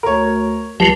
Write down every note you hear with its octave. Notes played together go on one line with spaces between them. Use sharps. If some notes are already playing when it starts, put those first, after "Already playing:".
D2 A#4 C#5
C#2 F3 F#3 G4 A5